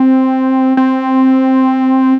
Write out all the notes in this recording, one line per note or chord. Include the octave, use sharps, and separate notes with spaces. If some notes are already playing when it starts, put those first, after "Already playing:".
Already playing: C4
C4